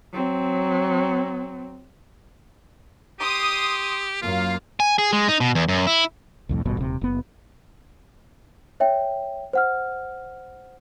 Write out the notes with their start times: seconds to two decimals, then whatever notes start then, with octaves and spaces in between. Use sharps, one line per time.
0.13 F#3 C4
3.20 G4 C6 D#6
4.22 F#2 A#3 F4 F5
4.80 G#5
4.98 G#4
5.12 G#3
5.28 D#4
5.40 B2
5.55 E2
5.69 F#2
5.87 E4
6.49 C2 F2 A2
6.65 D#1 A1 G2 B2
6.77 D#1 C3
7.01 F#1 B3
8.80 C#5 E5 G5
9.53 C5 F#5 F6